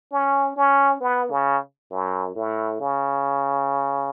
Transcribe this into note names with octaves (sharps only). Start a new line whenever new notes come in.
C#4
C#4
B3
C#3
F#2
A2
C#3